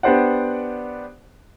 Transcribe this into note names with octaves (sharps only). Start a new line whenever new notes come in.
B3 D4 G4 C5 D5 F#5